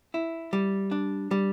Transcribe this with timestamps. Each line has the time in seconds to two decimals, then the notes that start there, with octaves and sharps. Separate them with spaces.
0.14 E4
0.53 G3
0.91 D4
1.31 G3